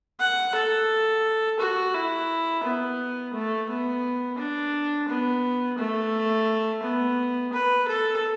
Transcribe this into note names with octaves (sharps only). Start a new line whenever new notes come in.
F#5
A4
F#4
E4
B3
A3
B3
D4
B3
A3
B3
B4
A4